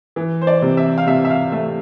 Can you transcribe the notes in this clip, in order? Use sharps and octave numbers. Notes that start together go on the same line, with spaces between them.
E3
C5
D5
C3
E5
F5
C3 E5
E5
F5
A3 E5